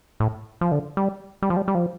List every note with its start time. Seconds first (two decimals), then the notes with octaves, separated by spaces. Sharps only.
0.20 A2
0.61 F3
0.72 D3
0.97 G3
1.42 G3
1.50 F3
1.57 G3
1.68 G3
1.75 F3